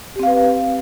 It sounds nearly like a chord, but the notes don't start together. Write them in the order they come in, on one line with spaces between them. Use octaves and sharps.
G4 C4 F5 B4